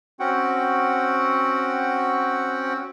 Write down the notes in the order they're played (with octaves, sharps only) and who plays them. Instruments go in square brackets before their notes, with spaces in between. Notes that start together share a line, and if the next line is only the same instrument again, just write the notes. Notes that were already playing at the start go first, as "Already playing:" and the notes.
[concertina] C4 C#4 F#4 F#5 G5